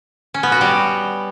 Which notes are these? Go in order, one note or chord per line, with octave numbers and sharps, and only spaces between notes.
C#4
B3
F#4
G3